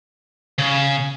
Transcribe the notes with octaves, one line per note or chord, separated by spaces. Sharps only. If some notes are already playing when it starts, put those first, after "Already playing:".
C#3